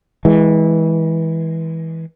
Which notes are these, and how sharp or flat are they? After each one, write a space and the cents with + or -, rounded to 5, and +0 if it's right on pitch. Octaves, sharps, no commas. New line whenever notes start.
E3 -20 G#3 +0